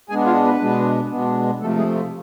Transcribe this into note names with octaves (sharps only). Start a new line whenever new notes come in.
B2 G#3 B3 D4 G#4 G#5
F4 F5
B3 B4
B2 G#3 B3 D4
B2 G#3 B3 D4
C3 F3 A3 A4
G#3 G#4
F4